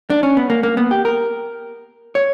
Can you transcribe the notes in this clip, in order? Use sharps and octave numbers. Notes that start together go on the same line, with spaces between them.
D4
C#4
B3
A#3
A#3
B3
G4
A#4
C#5